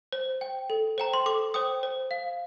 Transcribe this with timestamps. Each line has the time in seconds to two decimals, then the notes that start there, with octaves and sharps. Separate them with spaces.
0.13 C5
0.41 G5
0.70 A4
0.98 C5 G5 A#5
1.13 C6
1.26 A4 D6
1.54 C5 G5 D#6
1.83 C5
2.11 F5